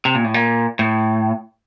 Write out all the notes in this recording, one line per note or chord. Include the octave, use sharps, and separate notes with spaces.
C3
A#2
A2
A#2
A2